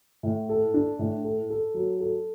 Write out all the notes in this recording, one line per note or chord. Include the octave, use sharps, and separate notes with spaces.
A2
A4
D4
A2
A4
A4
F#3
A4